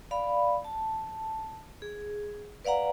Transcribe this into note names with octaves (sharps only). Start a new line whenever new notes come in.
D5 F5 B5
A5
G#4
B4 D5 F5 F#5 A#5